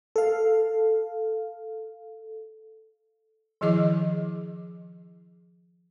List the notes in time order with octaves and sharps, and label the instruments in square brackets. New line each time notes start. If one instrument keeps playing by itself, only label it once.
[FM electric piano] A4 F5
[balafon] D#3 F3 E4 G#4 D#5 D6